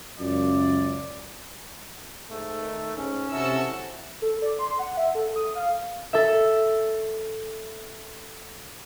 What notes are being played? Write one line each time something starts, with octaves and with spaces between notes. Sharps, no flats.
C#2 F#2 F4 D5
G#2 A3
D#3
G#2 C#4
C3 E4 F#4 A4 E6
A4
D5
C6
F#5
E5
A4
D#6
F5
A4 E5